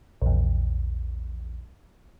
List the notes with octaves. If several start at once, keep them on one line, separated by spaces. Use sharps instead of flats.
A#1 E2